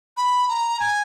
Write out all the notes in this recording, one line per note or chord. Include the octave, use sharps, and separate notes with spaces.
B5
A#5
G#5